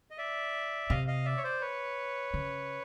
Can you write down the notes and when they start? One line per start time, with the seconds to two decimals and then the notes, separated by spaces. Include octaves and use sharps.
0.11 D#5
0.18 D5 E5
0.90 C3 D#5 F5
1.08 D#5 F5
1.25 D5 E5
1.37 C#5
1.43 C5 D5
1.61 B4 C#5
2.34 C#3